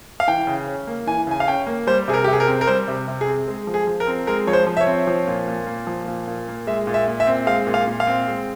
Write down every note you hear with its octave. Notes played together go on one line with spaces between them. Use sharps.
F5
E3 G5
C#3
C#4
A#3
E3 G#5
C#3 G#5
F5
C#4 G5
A#3
G3 C5
C3 G#4
A#4
G4
C3
G#4
A#4
C4
A#4
G3 C5
C3
C3
G#4
C4
G#3
F3
G#4
F3
A#4
C4
G#3 A#4
F3 C#5
C5
F3
E5
C#5
C4
F3
A#2
A#2
A#3
F3
A#2
A#2
A#3
G#3 E5
A#2
E5
A#2
E5
C4
G#3 F5
A#2
F5
A#2
F5
C4
G#3